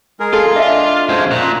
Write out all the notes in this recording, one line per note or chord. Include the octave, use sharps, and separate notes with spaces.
G#3 G#4 A#4
F4 A4
D4 D#5 E5
F#2 G#3 A3 C5 F5
A#2 A#5 F#6